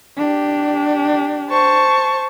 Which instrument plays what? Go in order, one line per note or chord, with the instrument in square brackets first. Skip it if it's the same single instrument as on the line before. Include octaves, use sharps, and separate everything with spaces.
[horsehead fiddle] D4 G4
[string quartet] C5 A5 C#6